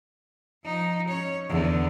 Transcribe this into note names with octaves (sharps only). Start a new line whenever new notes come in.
F3 D#4
C#4 C#5
E2 D3